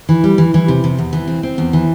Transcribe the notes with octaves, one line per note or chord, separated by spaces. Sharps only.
E3
G3
E3
E3
C3
C3
E2
E3
C4
C4
E2
E3